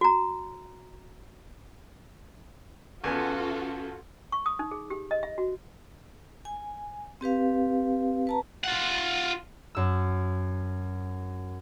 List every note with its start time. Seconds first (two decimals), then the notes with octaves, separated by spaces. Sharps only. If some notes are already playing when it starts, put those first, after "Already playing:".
0.01 F#4 A#5
3.04 E2 B3 C#4 F4 F#4 A4 G#5
4.32 C#6
4.46 D#6
4.59 D#4
4.71 G#4
4.90 G4
5.11 D#5
5.23 E5
5.38 F#4
6.45 G#5
7.21 C4 G4 B4 F5
8.27 B4 A5 A#5
8.64 F4 F#5
9.75 F#2 E6